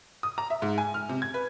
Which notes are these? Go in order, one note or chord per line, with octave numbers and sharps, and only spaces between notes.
D#6
A#5
E5
G#2
G#5
F6
C3
G#6
B4